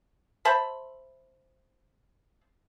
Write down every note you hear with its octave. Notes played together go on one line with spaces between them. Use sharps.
C5 E5 A5 B5